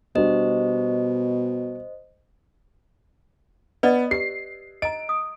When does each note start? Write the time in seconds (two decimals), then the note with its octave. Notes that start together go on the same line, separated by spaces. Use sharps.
0.15 B2 G3 D4 F#4 C5 D#5
3.83 B3 B4 D5 D#5
4.11 G4 C7
4.82 D#5 A#5 D7
5.09 D#6